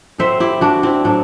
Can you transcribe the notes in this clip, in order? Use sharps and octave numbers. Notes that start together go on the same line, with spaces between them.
A2 F#3 C4 C5 E5
E4 G4
D4 F#4
C4 E4
A2 F#3 C4 D4